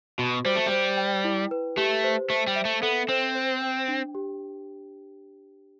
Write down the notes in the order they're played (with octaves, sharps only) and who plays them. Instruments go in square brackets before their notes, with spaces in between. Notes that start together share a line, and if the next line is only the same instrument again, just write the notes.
[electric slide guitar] B2 [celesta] F#4
[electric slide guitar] G3 [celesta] C5
[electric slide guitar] A3
[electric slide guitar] G3 [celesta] C5
[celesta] G5
E4
B4
[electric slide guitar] A3 [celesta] G4
[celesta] C5
[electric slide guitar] A3 [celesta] C5
[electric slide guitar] G3
[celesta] E5
[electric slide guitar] A3
[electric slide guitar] B3 [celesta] A4
[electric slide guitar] C4 [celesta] C5
[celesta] C5
G5
D4
G4